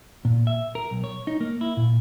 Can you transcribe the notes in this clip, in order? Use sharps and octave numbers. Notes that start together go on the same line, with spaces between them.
A#2
E5
A#4
B1
C#5
D#4
A#3
E4
A#2